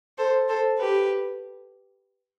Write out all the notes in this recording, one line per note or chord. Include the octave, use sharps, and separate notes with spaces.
A4 C5
A4 C5
G4 B4